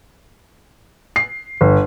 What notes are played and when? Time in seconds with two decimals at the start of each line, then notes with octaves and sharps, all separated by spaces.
1.16 C7
1.61 G1